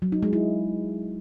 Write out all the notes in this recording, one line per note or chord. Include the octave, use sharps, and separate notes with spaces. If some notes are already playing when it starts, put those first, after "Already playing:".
F#3
D#4
G#3
E4